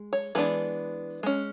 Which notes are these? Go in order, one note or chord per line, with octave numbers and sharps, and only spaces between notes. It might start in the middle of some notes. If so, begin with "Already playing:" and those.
Already playing: G#3
C#5
E3 G#3 B3 D4 B4
G#3 C#4